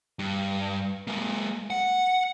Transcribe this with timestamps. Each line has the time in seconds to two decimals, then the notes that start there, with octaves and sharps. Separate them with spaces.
0.19 G2
1.07 G#3 A#3
1.70 F#5